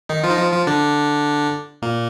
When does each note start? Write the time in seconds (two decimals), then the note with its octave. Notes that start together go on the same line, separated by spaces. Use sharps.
0.09 D#3 D#4
0.23 F3 F4
0.31 D#4
0.38 F3 F4
0.52 F3 F4
0.67 D3 D4
1.82 A#2 A#3